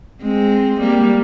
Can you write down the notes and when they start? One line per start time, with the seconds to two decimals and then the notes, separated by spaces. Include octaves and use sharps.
0.22 G#3 C4
0.81 G3 A#3